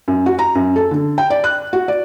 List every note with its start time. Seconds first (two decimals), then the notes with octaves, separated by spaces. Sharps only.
0.08 F#2
0.26 F#4
0.39 A#5
0.55 F#2
0.76 A4
0.91 D3
1.18 G5
1.30 D5
1.44 F#6
1.73 F#4
1.88 D5